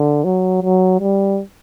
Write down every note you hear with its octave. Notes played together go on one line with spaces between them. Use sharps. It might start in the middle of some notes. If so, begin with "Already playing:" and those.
Already playing: D3
F#3
F#3
G3